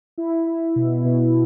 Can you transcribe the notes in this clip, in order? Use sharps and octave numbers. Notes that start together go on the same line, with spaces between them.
E4
E4
B2
B2